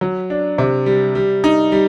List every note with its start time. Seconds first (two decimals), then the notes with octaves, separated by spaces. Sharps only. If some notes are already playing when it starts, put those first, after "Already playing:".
0.01 F#3
0.30 D4
0.58 C3
0.86 G3
1.15 G3
1.44 D#4
1.72 G3